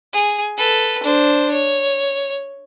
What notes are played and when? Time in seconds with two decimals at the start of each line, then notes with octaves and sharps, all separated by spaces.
0.13 G#4
0.57 A4 B4
1.03 D4 C5
1.51 C#5